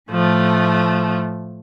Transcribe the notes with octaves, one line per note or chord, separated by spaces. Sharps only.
A2 F3 A3